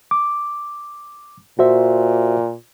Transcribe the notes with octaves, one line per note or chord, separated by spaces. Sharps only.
D6
A#2 F#4 C5 E5